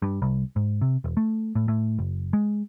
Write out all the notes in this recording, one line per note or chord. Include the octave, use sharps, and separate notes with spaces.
G2
C2
G#2
C3
E1
A3
A2
A2
F#1
G#3